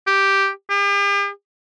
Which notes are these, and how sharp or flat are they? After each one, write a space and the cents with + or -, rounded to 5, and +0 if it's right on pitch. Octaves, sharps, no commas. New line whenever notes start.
G4 -5
G4 +45